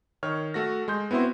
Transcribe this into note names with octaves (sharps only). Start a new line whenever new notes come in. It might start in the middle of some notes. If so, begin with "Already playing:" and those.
D#3 C#5 F6
A3 F#4 A#6
G#3 C6 G6
B3 C4 E4 F#4 C5